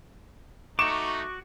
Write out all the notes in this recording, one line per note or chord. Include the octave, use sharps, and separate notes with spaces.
A3 D#4 F#4 C#6 D6 E7